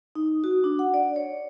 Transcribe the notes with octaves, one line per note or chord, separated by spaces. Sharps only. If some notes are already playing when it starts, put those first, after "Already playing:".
D#4
F#4
D4
F#5
D5
C#5